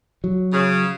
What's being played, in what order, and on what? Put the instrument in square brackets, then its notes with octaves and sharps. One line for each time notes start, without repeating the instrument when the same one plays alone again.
[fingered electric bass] F#3
[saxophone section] C#3